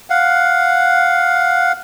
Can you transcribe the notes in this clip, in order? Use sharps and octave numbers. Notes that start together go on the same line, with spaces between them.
F5 F#5